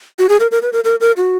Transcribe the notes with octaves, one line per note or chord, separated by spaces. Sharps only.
F#4
G#4
A#4
A#4
B4
A#4
A#4
A#4
F#4